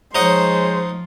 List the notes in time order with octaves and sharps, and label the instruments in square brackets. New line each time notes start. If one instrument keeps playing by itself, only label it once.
[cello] F3 [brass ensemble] G#3 C#5 [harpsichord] D#4 D#5 F#5 [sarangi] C5